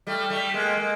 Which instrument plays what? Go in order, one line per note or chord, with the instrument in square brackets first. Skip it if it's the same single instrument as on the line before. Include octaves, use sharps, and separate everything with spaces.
[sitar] G3 A3
G3 A3
G#3 A#3
G#3 A#3